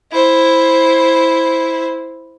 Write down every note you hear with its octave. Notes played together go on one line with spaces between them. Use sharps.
E4 C5